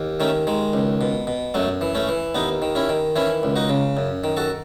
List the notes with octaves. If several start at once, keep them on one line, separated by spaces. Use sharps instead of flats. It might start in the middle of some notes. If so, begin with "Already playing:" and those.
Already playing: D#2
D#3 A3 C#4
D#3 G#3
C#2
B2
B2
F#2 F#3 A3
E3
A3 C#4
E3
D#2 B3 D#4
D#3
C#4 E4
D#3
E3 C#4 E4
C#2
D#4 F#4
C#3
F#2
D#3
F#4 A4